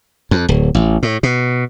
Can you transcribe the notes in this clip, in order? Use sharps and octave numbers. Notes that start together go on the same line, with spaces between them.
F2
D1
A1
A2
B2